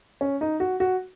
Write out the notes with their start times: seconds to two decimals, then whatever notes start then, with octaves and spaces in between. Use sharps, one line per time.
0.21 C#4
0.41 D#4
0.60 F#4
0.80 F#4